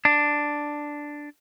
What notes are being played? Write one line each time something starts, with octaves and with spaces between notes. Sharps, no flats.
D4